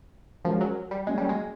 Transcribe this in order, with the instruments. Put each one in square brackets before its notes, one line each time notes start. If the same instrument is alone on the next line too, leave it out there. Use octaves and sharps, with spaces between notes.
[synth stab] F3 [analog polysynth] G#3 C#4 F#4 A#4
[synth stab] F#3
G3
[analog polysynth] F#3 A#3 C#4 [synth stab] G#3
[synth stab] G3
G#3